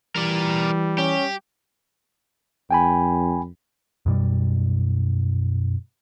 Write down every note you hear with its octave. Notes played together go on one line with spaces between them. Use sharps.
E3 G3 A#4 D5
C#4 G4
F2 G5 G#5 B5
F#2 B2 G3